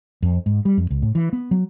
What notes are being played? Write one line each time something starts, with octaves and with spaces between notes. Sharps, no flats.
F2
G#2
G3
F2
C#2
A2
E3
B3
F#3